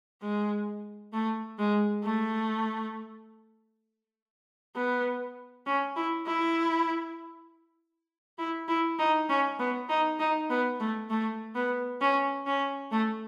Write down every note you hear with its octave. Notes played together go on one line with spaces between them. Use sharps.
G#3
A3
G#3
A3
B3
C#4
E4
E4
E4
E4
D#4
C#4
B3
D#4
D#4
B3
A3
A3
B3
C#4
C#4
A3